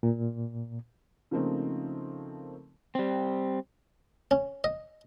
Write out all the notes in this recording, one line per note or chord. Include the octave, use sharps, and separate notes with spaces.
A#2
C#3 F3 A3 A#3 C4 D#4
G3 C4
C#4
D#5